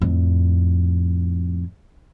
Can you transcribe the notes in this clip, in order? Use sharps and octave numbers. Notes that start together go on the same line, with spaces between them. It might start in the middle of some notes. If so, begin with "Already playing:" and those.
F2 A2